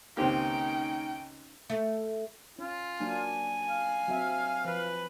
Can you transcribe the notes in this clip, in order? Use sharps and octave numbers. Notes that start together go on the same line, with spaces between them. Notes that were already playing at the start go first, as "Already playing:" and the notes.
C#2 D#3 A#3 C4 C#4 D#4 G4 G5
A3
C#4 F4
F#3 A#3 D4 G#5
F5
F#3 C4 E5
F3 B4